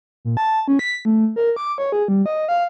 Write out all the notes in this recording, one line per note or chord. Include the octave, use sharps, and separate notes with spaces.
A#2
A5
C#4
B6
A3
A#4
D6
C#5
G#4
G3
D#5
F5